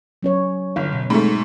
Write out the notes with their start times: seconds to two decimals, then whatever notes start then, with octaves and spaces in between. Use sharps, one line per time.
0.23 F#3 C#4 C#5
0.76 G1 F5
0.93 B2
1.10 G#2 A3